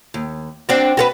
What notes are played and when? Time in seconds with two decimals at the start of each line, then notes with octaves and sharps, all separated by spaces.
0.14 D#2
0.69 C4 D4 F#4
0.97 F#4 A4 B4